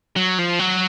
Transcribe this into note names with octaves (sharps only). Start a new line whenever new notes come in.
F#3
F3
F#3